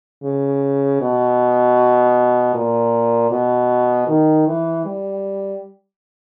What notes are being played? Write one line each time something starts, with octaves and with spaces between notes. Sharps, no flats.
C#3
B2
A#2
B2
D#3
E3
G3